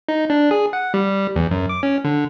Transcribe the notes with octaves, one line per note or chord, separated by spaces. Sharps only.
D#4
D4
G#4
F#5
G3
E2
F#2
D6
C#4
D3